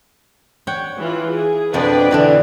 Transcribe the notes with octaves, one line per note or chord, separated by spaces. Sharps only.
C#5 F#5 G5
E3 F4
G#4
F2 B2 F3 D4 B4 D5
B2 D3 E3 D4